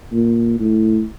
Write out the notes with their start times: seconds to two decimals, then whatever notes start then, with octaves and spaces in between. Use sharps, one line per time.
0.13 A#2
0.60 A2